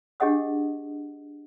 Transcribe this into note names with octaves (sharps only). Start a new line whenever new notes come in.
D4 G4 G#4 D#5 F#5 D#6